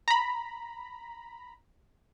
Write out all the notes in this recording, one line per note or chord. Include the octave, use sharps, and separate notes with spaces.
A#5 B5